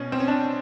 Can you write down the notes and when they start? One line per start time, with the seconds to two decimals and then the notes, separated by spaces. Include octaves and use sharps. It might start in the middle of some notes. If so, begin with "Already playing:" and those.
Already playing: B2 C#4
0.12 C4
0.20 C#4
0.28 D4